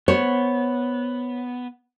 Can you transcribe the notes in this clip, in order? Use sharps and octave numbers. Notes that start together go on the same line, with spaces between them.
B3 C5 C#5